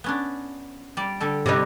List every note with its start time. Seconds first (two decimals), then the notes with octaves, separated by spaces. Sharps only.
0.04 B3 C#4 D4
0.97 G3 D5
1.20 D3 G3 A4
1.46 C3 G3 D#4 E4 B4